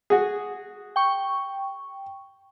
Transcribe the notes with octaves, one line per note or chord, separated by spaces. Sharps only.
F#4 G#4
G5 C#6